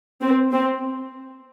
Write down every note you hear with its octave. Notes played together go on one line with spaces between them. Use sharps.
C4
C4